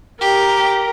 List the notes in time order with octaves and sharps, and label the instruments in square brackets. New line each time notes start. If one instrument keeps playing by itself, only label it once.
[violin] G4 [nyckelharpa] A#4